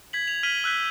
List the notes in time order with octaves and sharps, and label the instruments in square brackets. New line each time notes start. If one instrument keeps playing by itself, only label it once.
[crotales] G#6 B6 F#7
F7
F6 B6 D#7 F#7 G7
E6 F#6 G6 B6